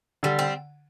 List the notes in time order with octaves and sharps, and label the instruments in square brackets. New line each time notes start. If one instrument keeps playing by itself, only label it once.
[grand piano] D3 [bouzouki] G3
[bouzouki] C4